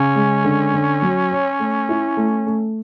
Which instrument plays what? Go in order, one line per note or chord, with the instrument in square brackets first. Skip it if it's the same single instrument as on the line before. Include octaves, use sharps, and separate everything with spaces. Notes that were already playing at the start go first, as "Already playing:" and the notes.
Already playing: [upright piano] C#3 [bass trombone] C#4
[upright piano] G#3
D3
D3
F#3
C#5
A3
E4
A3
A3